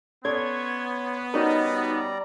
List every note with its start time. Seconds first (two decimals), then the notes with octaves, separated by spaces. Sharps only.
0.25 B3 C#4 A4 C#5 D5 C6 G#6
1.34 G3 C#4 D#4 F#4 A#4 D5 D#5 A#5